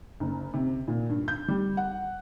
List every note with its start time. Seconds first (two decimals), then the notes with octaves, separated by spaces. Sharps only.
0.20 F#1
0.54 C3
0.88 A#2
1.10 G2
1.28 G6
1.48 G3
1.77 F#5